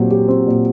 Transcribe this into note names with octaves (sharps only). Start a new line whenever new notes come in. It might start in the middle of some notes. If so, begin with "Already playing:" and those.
Already playing: A#2 F#3 C4 G4
G4
C4
A#2